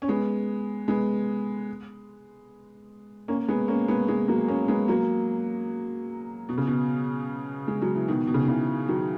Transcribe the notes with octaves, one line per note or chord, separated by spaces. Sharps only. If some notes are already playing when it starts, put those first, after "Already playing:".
C#4
G#3 B3
G#3 B3
A#3 C#4
G#3 B3
A#3 C#4
G#3 B3
G#3 B3
F#3 A#3
A#3 C#4
G#3 B3
F#3 A#3
B2
C#3
B2
G#3
F#3
E3
B2 D#3
B2
C#3
D#3
C#3 E3
D#3 F#3